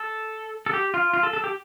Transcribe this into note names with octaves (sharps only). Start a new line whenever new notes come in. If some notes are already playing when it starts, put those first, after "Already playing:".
Already playing: A4
A4
G4
F4
F4
A4
A4
G4